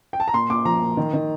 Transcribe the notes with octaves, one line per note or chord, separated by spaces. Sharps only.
G5
A5
A#5
A#2 C6
A#2 D6
F3 A#5
A#2
D#3
D#3